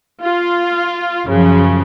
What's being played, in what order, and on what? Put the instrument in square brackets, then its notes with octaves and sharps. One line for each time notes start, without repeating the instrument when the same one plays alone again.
[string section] F4
F#2 C#3 F3